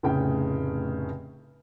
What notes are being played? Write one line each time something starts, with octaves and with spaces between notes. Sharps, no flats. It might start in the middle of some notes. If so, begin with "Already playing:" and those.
F1 A2 C#3 G#4 G5